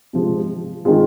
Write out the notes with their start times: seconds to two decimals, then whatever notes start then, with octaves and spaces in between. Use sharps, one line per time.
0.13 C3 F3 G#3
0.85 D#3 G#3 C4 F4 G#4